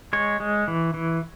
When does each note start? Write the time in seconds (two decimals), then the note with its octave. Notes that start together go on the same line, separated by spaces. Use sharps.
0.13 G#3 C#5
0.40 G#3
0.68 E3
0.94 E3